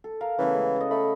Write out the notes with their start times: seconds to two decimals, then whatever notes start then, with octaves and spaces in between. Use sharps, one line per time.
0.04 A4
0.21 A#4 F5
0.39 C#3 E3 A3 B3
0.54 G#3
0.76 A4 D#5
0.91 A3 B5